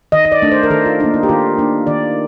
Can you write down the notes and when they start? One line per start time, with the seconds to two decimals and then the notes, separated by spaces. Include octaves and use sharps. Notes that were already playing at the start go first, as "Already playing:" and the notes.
0.12 D#3 D#5
0.25 D#5
0.32 D5
0.42 A3 D4
0.52 C5
0.63 A#4
0.70 D#3 A4
0.86 F4
1.00 A#3 D4 D#4
1.14 D#4
1.23 G4
1.29 D#3 F4
1.58 A#3 D4
1.87 D#3 D5